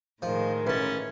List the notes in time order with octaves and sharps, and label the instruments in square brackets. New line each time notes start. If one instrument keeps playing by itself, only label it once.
[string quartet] A2 D#3 G#3 [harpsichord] F3
[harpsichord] A1 A5 [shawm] C#4 [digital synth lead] B4